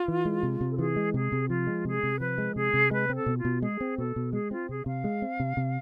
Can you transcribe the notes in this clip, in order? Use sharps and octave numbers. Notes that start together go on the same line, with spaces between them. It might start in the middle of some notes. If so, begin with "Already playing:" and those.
Already playing: F4
E3
G#3
C3
C3
A4
E3 G#4
G#3
C3 G#4
C3
F3 F4
G#3
C3 G#4
C3
F3 B4
G#3
C3 G#4
C3
G#3 B4
C4
A4
B2
F4
B2
G#3 G#4
C4
B2 A4
B2
G#3 G#4
C4 F4
C3 G#4
C3 F5
G#3
C4
C3
C3